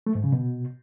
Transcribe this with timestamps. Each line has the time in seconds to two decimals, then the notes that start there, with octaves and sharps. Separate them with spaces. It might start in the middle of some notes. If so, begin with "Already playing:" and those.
0.06 A3
0.15 G#2
0.24 C#3
0.32 B2